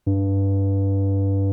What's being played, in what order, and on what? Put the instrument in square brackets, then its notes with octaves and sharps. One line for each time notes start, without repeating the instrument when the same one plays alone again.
[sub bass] G2